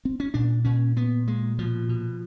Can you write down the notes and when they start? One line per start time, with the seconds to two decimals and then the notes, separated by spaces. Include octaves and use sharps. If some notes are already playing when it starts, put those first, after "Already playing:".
0.05 C4
0.20 C#4
0.34 A#2 D4
0.65 A#2 C#4
0.96 A#2 B3
1.27 A#2 G#3
1.59 B2 F3
1.89 B2